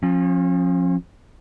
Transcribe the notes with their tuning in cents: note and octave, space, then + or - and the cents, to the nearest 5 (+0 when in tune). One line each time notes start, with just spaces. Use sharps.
F3 +20 C#4 -40